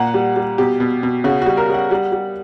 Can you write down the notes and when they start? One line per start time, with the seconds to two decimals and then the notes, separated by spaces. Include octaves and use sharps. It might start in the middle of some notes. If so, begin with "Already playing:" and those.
Already playing: A#2 F#5
0.14 G3
0.36 G3
0.58 B2 G4
0.80 B2
1.03 B2
1.24 C#3 F#4
1.42 G3 F#4
1.57 A#4
1.69 G3 F#5
1.91 G3
2.12 G3